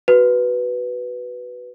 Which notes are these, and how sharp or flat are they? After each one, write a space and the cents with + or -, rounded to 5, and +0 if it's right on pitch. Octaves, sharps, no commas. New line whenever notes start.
F#4 +10 B4 +0